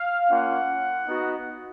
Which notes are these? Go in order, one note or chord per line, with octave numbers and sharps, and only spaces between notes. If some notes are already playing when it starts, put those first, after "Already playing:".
Already playing: F5
A#3 C#4 F4 F#5
B3 D#4 F#4